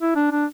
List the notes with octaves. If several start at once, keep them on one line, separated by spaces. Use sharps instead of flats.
E4
D4
D4